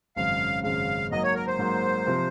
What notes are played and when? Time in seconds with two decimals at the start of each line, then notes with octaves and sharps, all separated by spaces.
0.16 G#1 F#2 C#3 G#3 F5
0.63 G#1 F#2 C#3 G#3 F5
1.11 G#2 F#3 A#3 D#5
1.24 C#5
1.35 A#4
1.48 C5
1.59 G#2 F#3 A#3
2.07 C3 F3 C4